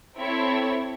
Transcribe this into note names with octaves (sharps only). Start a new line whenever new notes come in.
C4 E4 A4 C#5 E5